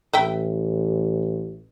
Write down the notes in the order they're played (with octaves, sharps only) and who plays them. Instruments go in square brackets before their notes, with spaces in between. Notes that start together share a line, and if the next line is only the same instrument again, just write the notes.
[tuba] A1 [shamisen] B4 E5 G5